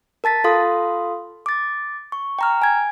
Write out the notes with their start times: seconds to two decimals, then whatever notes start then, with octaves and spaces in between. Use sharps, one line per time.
0.24 A#4 A5 A6 B6
0.44 F4 A4 F5 C6 D#6
1.46 D6 A6
2.12 C#6
2.39 G5 A#5 F6
2.62 G#5 G#6